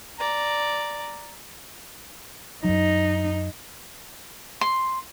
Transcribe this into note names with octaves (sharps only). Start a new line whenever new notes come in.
D5 A#5
F#2 F#3 D#4
C6